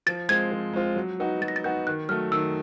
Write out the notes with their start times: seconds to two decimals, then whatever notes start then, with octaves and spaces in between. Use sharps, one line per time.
0.07 F3 A6
0.29 G#3 C4 F4 G#6
0.52 F3
0.73 G#3 C4 F4
0.96 F#3
1.20 B3 D#4 F#4
1.41 F#3 A6
1.48 A#6
1.56 A6
1.64 B3 D#4 F#4 G6
1.87 D#3 F#6
2.09 F#3 A3 F6
2.32 D#3 E6